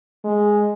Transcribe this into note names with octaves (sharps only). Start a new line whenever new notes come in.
G#3